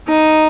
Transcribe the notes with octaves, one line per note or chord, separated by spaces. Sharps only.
D#4